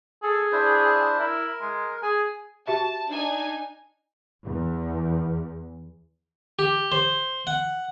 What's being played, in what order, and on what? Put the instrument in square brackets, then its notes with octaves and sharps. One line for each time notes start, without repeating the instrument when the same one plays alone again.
[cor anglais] G#4 [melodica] A4
[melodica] D4 E4 C5
[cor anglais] E4 [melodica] A#4
[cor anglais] G#3
[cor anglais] G#4 [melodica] G#5
[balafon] F#4 G4 E5 [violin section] A5
[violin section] D4 D#4 G#5
[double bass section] E2
[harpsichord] G4
C5
F#5